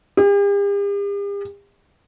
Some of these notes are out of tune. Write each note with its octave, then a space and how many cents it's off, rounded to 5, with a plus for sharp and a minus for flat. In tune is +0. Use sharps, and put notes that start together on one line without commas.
G4 +45